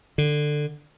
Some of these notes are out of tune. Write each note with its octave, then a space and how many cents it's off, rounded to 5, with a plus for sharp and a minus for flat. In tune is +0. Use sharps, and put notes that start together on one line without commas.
D3 +15